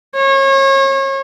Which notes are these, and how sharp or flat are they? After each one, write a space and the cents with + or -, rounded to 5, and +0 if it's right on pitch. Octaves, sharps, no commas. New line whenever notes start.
C#5 -35